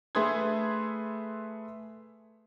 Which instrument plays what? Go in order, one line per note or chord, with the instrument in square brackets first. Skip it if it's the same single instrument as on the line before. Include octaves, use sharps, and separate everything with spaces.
[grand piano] A3 G#4 B4 C6 D#6 G#6